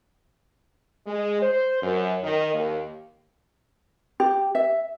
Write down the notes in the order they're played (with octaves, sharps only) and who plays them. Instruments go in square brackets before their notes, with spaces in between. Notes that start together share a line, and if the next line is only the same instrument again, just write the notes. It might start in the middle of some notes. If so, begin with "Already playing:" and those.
[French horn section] G#3
C5
F#2
D#3
D#2
[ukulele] G4
E5